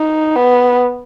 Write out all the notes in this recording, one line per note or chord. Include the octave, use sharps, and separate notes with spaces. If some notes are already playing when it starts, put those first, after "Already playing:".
Already playing: D#4
B3